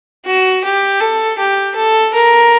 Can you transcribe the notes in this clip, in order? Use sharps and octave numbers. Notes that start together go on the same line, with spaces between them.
F#4
G4
A4
G4
A4
A#4